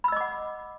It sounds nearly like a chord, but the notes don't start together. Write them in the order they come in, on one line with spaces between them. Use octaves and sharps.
B5 E6 D#5 D6 F#5